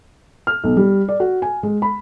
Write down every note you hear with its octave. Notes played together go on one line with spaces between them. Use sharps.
F6
B1
G3
D5
F#4
G#5
G#3
B5